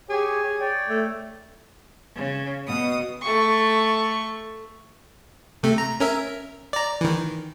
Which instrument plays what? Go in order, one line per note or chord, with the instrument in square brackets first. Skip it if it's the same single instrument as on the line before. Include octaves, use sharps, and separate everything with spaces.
[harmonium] G4 C#5 [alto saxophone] G#4
[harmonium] C#5 D5 G5
[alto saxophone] A3
[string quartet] C#3
[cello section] B2 [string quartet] D#6
[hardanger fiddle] A3 C#6
[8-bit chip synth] C3 A3
A#5
C#4 A#4 E5
D5 A#5
D#3 E3